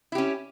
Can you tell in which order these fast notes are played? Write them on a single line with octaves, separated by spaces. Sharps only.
E4 G4 C#4